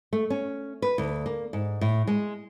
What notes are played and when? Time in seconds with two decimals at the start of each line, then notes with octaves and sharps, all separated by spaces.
0.13 A3
0.30 C#4
0.82 B4
0.98 D2
1.26 A#3
1.53 G#2
1.81 A2
2.07 G#3